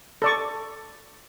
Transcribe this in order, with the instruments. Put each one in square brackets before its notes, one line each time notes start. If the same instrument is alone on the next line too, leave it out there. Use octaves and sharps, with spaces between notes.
[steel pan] A4 D5 C#6